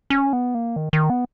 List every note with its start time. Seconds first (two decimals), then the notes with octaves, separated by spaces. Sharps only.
0.10 C#4
0.33 B3
0.55 A#3
0.76 D#3
0.93 D#3
1.10 B3